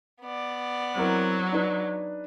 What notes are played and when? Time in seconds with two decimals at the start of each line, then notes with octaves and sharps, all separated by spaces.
0.21 B3 D5
0.96 F#3 C4 E4 A#4
1.52 D4 D#4 B4